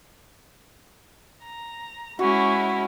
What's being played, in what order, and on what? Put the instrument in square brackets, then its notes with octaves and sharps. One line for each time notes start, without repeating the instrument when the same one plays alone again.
[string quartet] A#5
[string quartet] G#3 C#4 E4 [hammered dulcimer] F#4